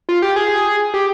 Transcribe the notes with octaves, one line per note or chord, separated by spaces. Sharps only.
F4
G4
G#4
G4